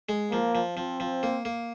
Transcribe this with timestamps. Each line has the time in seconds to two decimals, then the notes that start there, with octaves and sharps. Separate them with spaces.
0.09 G#3
0.31 F3 A#3
0.55 F3
0.77 F3 C4
1.00 F3
1.23 A#3
1.45 A#3